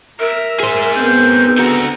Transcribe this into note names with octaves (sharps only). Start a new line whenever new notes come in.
A#4 E5 A#5
G#4 C5
B3 C4 G6
D3 F#4 A#5